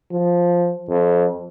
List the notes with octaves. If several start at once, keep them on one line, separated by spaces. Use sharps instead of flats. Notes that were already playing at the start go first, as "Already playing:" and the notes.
F3
F2